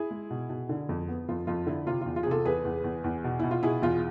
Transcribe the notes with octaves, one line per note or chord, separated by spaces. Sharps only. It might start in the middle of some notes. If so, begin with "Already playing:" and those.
Already playing: E4 G#4
G#3
B2
B2
D3
F2
B3
F2 F4
F2 F4
D3 E4
C3 F4
E2 F4
F4
G#4
C3 F4 A4
E2 G#4 B4
E2
E2
E2
B2
B2 E4
F4
B2 E4 G#4
E2 F4